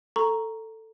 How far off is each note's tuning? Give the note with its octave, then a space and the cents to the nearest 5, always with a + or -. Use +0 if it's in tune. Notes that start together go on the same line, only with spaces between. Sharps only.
A4 +15 A#5 +0 C#6 +0